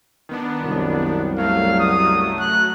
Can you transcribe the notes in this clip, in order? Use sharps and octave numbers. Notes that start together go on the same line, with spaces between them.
D#3 B3 D4
C2 F#2 G3
F#3 A3 F5
D#6
F#6